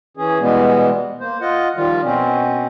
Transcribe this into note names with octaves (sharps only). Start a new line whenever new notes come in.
E3 C#4 G#4
B2 E3 G3 G#3 B3
A#3 C5
F4 D#5 F#5
D#3 F3 G3 F4
B2 C4 C#4